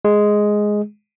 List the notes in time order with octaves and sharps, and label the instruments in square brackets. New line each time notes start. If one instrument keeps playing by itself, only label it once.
[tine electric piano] G#3